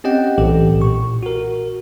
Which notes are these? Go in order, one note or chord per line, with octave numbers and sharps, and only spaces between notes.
C4 C#4 G4 D#5 F#5 G5
B1 A2 E3 G4 A4
A#2 C#6
F#4 A#4